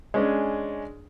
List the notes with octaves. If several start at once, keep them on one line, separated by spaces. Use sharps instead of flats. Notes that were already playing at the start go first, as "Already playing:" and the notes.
G#3 C#4 D4